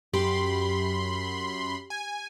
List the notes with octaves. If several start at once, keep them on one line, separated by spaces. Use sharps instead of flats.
F#2 G4 B5 C6
G#5